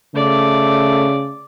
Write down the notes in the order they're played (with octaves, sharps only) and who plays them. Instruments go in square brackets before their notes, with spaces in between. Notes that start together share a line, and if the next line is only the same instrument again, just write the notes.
[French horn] C#3 [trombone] A3 [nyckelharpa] D5